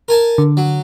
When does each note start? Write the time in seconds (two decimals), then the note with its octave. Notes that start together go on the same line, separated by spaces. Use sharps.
0.08 A#4 G#5 A5
0.38 D3
0.57 F#3